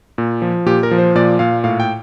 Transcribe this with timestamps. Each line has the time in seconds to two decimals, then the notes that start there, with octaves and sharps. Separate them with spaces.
0.18 A#2
0.42 F3
0.66 A#2 G4
0.83 A#4
0.91 F3
0.98 C5
1.15 A#2 D5
1.39 A#2 F5
1.64 A2 F5
1.80 G5